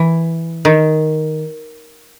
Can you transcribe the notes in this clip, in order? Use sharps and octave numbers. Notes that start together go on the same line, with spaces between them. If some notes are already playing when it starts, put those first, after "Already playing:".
Already playing: E3
D#3